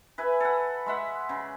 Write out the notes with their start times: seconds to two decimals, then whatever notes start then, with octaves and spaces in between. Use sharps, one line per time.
0.18 B4 E5 G#5
0.40 A4 F#5
0.86 G#3 E5 F#5
1.29 C#3